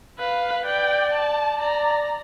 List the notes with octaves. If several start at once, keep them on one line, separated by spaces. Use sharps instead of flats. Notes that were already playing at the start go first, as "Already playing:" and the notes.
B4 F5
D5 G5
A5
D5 A#5